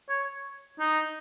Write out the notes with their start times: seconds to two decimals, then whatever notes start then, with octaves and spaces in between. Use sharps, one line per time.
0.09 C#5
0.79 D#4